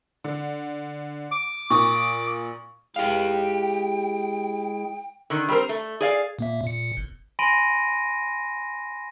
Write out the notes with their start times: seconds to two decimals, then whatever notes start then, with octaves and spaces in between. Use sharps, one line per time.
0.24 D3
1.32 D6
1.70 A#2 C#6 D#6
2.96 G#3 E4 G4 G#4 F5 G5
5.30 D3 D#3
5.48 G3 C4 A#4 C5
5.69 A3
6.01 G#4 D5 F5
6.39 A#2 A#3 E5
6.63 A#2 C#7
6.97 G1
7.39 G#5 B5 C6 A#6 D7 D#7